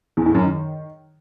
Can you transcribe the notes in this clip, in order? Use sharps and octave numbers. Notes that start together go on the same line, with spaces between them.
E2
A2
F#2
D#3